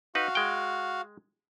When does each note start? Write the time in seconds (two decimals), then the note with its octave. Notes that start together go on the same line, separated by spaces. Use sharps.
0.15 D#4 F#4 B4 F5
0.35 G#3 G5